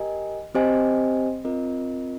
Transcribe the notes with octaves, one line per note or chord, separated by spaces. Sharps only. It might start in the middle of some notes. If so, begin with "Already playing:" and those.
Already playing: G4 A#4 D#5 G#5
C4 G4 C5 D#5 G#5
C4 F4 A#4 D#5